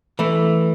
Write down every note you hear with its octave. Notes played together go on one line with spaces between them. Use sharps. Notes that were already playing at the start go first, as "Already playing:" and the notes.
E3 A3 E4